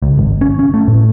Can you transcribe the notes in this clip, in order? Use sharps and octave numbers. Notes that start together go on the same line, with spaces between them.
C#2
G#1
C#4
C#4
A3
A2